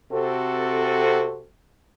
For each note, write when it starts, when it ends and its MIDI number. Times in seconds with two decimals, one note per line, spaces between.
0.12 1.45 48
0.12 1.45 60
0.12 1.45 66
0.12 1.45 69